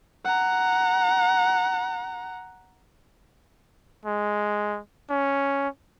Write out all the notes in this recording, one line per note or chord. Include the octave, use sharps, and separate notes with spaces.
F#5 A#5
G#3
C#4